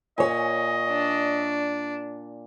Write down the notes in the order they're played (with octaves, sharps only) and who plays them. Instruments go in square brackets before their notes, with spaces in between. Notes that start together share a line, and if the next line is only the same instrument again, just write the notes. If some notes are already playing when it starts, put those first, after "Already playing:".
[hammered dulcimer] A#2 [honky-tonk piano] C#5 G#5 [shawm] D#5
[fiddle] D4